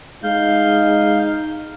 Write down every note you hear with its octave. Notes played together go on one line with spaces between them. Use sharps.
G#3 D#4 F5 G6